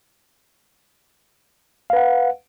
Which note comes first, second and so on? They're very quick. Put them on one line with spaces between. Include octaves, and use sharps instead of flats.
F5 B4 F#5